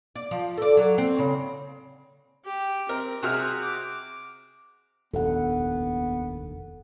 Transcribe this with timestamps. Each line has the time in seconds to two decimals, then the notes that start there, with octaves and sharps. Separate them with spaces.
0.16 D5
0.31 F3
0.58 A4 D5
0.77 F#3
0.98 C4
1.19 C#3
2.45 G4
2.89 C4 A#4
3.23 C3 F#4 G#4 F6
3.61 D6
5.14 F1 A#1 D#2 B3 A4 F#5